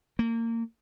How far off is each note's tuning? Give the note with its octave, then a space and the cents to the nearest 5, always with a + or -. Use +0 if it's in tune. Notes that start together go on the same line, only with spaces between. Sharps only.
A#3 -25